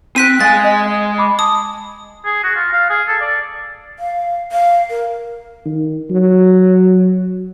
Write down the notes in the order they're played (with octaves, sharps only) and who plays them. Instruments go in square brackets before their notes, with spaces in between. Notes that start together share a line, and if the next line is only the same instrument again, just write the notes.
[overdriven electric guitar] C4 [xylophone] F#6 B6 D#7
[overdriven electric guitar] G#3 G#5 [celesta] F5 [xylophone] A6
[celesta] D#5
B5 D6
[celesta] A5 [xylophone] D#6
[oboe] G#4
F#4
F4
F5
G#4
A4
D5
[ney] F5
F5
A#4
[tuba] D#3
F#3